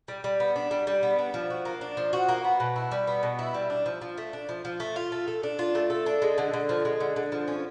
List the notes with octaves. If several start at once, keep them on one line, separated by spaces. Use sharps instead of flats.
G3
G3
B3
D4
G3
G3
B3
D4
F3
F#4
A#3
D4
F3
F#4
A#3
B3
B2
E4
G3
B3
B2
E4
G3
D4
F3
F3
A3
D4
F3
F3
A3
F4
A3
A4
D4
F4
A3
A4
D4
G#3
D3
D3
F3
G#3
D3
D3
F3
C#4